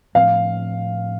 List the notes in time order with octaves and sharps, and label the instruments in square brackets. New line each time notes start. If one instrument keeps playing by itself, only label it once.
[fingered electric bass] A2 F3 C4 [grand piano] F5